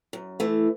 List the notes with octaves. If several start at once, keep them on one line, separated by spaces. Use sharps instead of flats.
F#2
E3 A3